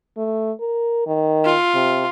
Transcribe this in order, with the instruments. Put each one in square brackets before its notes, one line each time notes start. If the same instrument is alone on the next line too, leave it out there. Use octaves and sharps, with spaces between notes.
[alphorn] A3
A#4
D#3
[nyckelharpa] F4
[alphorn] C3